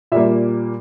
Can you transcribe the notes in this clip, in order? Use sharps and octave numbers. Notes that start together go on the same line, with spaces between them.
A#2 G3 A#3 E5